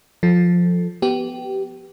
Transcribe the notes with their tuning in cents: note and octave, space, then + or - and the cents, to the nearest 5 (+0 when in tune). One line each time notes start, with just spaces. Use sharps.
F3 +10 A4 +0
B3 +0 G4 -20